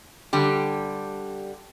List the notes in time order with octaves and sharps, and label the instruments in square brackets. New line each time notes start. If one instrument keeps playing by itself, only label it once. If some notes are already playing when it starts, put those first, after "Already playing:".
[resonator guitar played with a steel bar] D3 G3 G4